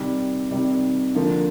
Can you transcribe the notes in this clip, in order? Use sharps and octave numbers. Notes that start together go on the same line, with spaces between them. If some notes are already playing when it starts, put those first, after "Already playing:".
Already playing: C3 D#3 G3
C3 D#3 G3
D3 F3 A#3